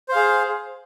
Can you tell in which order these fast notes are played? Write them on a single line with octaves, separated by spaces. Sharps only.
C5 F5 G#4